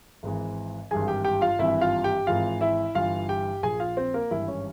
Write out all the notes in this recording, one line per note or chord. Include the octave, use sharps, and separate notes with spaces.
G#1 G#2 E3
G#1 G2 E3 G#4 G#5
G4 G5
G4 G5
F4 F5
G#1 G2 E3 E4 E5
F4 F5
G4 G5
G#1 G#2 E3 F4 F5
E4 E5
G1 G2 E3 F4 F5
G4 G5
A#1 A#2 G#4 G#5
F4 F5
C4 C5
A#3 A#4
G#1 G2 E3 E4
C#4